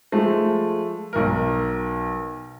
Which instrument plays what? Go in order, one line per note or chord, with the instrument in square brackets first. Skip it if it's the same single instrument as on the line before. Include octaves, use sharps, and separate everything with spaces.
[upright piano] F3 G#3 A3
B1 A#4